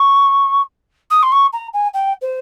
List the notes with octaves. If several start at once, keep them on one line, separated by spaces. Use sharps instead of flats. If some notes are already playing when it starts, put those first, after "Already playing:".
Already playing: C#6
D#6
C6
C#6
A#5
G#5
G5
C5